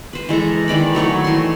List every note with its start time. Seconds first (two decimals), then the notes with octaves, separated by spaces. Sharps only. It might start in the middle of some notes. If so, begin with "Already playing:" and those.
0.13 B4 C5
0.29 E3 G#3 A4 A#5
0.68 D#3 E3 D5 B5
0.95 F#3 A3 D#4 C#5
1.24 E3 C6